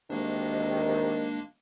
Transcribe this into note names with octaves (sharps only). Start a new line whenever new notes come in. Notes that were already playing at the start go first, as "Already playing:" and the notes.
D2 C3 D#3 G#3 A#3 D4